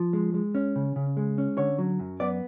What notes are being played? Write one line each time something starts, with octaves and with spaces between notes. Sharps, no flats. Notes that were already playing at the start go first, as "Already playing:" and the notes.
Already playing: F3
G#3
G#3
C#4
C#3
C#3
G#3
C#4
D3 C#5
F#3
F#2
B3 D5